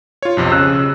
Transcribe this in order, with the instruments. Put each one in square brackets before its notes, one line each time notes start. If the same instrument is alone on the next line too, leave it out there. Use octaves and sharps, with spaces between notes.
[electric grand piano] F4 C#5
B1 F2 C3
[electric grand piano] C#3 [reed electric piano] E6 F#6